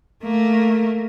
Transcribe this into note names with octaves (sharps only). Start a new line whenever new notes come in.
A3 A#3